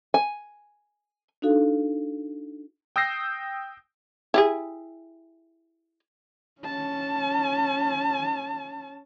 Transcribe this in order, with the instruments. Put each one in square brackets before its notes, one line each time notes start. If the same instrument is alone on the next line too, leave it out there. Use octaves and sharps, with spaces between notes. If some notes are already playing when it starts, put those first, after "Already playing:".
[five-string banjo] G#5
[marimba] D4 D#4 F#4 A4 F5
[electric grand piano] G5 D#6 E6 G6 A#6 C7
[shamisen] E4 G4 G#4
[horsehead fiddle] C#4 A5